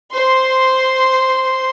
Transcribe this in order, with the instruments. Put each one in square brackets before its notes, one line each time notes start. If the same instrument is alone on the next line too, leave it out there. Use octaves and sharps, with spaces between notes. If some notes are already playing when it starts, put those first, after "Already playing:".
[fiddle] C5 C6